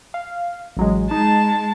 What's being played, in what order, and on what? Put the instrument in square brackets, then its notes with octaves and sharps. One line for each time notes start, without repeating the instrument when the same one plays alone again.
[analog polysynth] F5
A1 F#3 G#3
[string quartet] G#3 A5 [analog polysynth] D#4